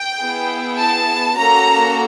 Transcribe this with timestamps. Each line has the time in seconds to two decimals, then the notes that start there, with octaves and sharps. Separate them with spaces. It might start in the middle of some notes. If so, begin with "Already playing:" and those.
Already playing: G5
0.19 B3 E4 G#4
0.78 A5
1.38 A#3 C#4 F#4 A4 A#5